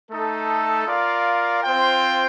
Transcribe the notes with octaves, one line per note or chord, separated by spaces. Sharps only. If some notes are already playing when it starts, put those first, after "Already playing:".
A3 D#4 A4
F4 A#4 D5 F5
C4 F4 C5 G5